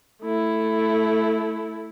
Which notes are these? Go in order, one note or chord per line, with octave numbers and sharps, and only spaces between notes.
A3 E4